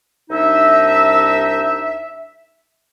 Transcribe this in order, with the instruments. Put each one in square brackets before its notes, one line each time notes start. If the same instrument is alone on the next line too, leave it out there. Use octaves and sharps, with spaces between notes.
[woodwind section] C2 D4 D#4 E5